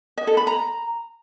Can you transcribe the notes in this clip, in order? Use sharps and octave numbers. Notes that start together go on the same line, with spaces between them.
D#5
A4
B5
A#5